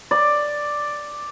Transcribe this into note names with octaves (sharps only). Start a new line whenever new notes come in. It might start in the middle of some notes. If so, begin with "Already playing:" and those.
D5